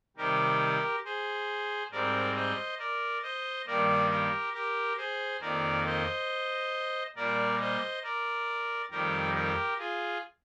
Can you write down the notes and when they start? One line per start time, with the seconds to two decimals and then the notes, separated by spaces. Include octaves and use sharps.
0.17 C3 D#3 G3 G4 A#4
1.05 G#4 C5
1.92 G#2 G3 C4 A#4 D5
2.35 C5 D#5
2.79 A#4 D5
3.23 C5 D#5
3.67 G2 D#3 G3 A#3 A#4 D5
4.10 G4 A#4
4.54 G4 A#4
4.97 G#4 C5
5.41 F2 D#3 A#3 A#4 D5
5.85 C5 D#5
7.16 A#2 G3 A#3 A#4 D5
7.60 C5 D#5
8.03 A#4 D5
8.91 F2 D#3 G3 G4 A#4
9.35 G4 A#4
9.79 F4 G#4